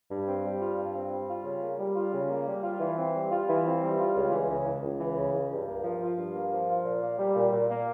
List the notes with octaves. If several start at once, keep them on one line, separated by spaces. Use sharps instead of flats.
G2
C4
G3
F4
G2
C4
G3
F4
C#3
A#3
G3
F4
C#3
A#3
G3
F4
E3
C4
G3
F4
E3
C4
G3
F4
C#2
E3
C#3
C#2
C#2
E3
C#3
C#2
G2
A#3
F3
F4
G2
A#3
F3
F4
A#2
A#3
G3
A#2
A#2
A#3